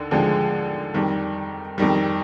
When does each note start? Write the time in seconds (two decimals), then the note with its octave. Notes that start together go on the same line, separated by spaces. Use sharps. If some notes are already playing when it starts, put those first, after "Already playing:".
Already playing: D#2 D3
0.11 D#2 D3 F3 G#3
0.94 F2 D#3 G3
1.78 F2 D#3 G3